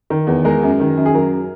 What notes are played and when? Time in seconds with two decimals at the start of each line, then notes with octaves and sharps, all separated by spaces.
0.10 D#3
0.27 E2
0.45 G#3 A#4
0.63 F#2
0.80 D#3
0.97 F#2
1.06 G#4
1.14 F#3 A#4